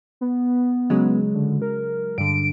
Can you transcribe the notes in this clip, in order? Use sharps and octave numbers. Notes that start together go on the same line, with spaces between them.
B3
C#3 F#3 G#3
D3
A#4
G2 D3 D7